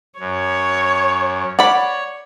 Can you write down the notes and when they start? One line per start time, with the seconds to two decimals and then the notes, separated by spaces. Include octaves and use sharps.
0.19 F#2 C#5
1.59 C#5 D5 F#5 B5